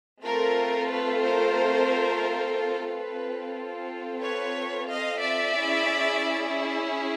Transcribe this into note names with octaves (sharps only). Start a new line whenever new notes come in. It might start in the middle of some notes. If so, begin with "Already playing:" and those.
A3 C4 F4 A4 A#4
B4
A#4 C5
C4 F4 A4 B4
B4 C#5
D#5 F5
D5 E5
C#4 E4 G#4